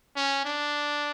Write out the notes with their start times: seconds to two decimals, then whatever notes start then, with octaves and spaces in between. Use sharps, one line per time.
0.16 C#4
0.45 D4